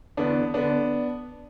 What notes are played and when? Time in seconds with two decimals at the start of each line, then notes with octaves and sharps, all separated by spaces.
0.17 E2 D3 B3 D4
0.54 D3 B3 D4